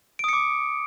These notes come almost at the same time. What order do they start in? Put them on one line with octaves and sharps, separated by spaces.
D7 D#6 C#7 D6